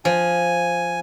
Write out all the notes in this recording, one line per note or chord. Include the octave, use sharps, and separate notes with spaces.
F3 G#5